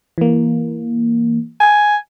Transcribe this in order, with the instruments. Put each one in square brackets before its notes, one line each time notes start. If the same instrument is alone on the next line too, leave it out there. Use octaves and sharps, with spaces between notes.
[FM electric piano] E3 A#3
[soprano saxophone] G#5